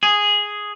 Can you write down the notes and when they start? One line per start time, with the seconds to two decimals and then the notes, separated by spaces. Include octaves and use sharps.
0.03 G#4